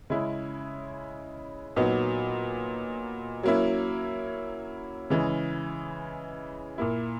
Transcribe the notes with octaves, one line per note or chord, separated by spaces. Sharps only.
C#3 G#3 C#4 E4
A#2 F#3 B3 D#4
F#3 A#3 C#4 E4
C#3 E3 G#3
A#2 A#3 E4